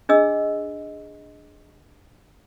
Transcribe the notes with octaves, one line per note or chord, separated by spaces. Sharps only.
D4 G#4 D#5 E6